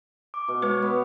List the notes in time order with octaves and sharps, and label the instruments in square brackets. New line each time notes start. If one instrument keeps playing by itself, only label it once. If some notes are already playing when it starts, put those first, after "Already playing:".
[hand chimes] D6
[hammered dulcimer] B2
[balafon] G#3 B4 [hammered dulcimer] C#5
[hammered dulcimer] B3